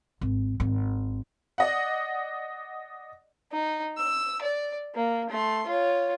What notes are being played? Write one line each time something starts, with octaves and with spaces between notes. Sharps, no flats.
G#1
G#1
D5 D#5 F#5
D#4
E6
D5
A#3
A3 C6
F4 C#5